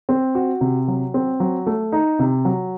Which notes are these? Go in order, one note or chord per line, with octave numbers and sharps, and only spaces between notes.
C4
F#4
C3
F#3
C4
F#3
A3
D#4
C3
F#3